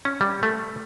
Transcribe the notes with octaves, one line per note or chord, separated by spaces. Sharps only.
C#4
G3
A3